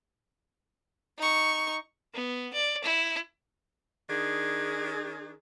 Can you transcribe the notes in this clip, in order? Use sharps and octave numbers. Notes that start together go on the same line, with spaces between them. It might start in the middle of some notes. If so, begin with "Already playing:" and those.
D#4 C#6
B3
D5
E4
D#3 D4 G#4